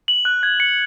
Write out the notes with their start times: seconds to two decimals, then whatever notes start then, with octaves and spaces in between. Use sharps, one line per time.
0.08 F#7
0.25 F#6
0.43 G#6
0.60 C#7